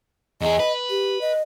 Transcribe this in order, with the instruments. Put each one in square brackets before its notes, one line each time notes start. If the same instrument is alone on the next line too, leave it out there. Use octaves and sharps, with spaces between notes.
[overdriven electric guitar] E2 G#4 [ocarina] D#5
[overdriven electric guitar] B4
[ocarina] G4
D#5